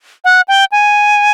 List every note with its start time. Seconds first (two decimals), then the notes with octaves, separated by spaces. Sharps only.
0.25 F#5
0.48 G5
0.72 G#5